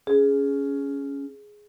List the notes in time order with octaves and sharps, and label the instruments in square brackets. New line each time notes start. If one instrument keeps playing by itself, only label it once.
[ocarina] C#4 [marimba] G#4